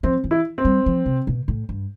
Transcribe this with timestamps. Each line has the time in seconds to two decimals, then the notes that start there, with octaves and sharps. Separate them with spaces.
0.03 F3 C4
0.24 E3
0.31 E4
0.58 C4
0.65 G3
0.86 F3
1.06 C3
1.27 B2
1.48 A2
1.69 G2